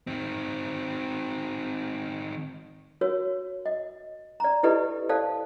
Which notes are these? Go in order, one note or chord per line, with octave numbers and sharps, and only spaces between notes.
D#3 C4
F#4 A#4 C#5
D#5
D5 A#5
E4 G4 A4 B4 D5 D#5
A4 C5 D5 F5 A5